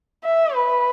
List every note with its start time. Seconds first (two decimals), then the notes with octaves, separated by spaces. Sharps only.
0.24 E5
0.55 B4